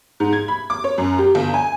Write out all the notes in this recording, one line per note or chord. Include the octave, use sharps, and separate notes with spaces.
G#2
G#6
B5
D6
C#5
F#2
G4
G1
G#5